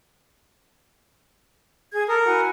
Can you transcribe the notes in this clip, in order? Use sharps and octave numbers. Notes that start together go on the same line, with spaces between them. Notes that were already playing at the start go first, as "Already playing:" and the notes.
G#4 G#6
A4 A#4 D#6
E4 F#4 G#5